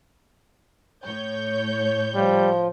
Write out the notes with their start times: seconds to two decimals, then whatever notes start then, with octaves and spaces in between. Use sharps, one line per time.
1.04 A2 C#5 G6
2.15 F3 G3 F4